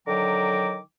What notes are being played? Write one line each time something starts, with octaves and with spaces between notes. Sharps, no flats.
D3 D#3 F#3 G5 A#5 D6